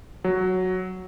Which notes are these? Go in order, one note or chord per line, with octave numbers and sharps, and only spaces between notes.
F#3